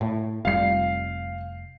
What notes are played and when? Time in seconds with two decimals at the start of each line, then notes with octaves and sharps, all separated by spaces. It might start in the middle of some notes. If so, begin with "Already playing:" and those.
0.01 A2
0.45 F1 G3 F5 C7